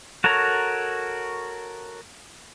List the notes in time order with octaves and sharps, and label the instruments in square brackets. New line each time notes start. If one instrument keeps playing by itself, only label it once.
[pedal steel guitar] F#4 A4 A#4 C#5 A#5